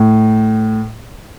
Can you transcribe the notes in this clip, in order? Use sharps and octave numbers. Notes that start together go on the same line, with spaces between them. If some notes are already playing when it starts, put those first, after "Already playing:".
Already playing: A2